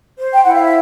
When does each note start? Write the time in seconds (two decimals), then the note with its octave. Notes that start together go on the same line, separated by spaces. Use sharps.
0.17 C5
0.33 G5
0.44 E4 F#5
0.53 F5
0.63 E5